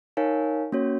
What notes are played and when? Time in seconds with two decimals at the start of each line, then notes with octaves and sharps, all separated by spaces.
0.17 D#4 A#4 C#5 F5 G#5
0.72 A#3 C#4 F#4 C#5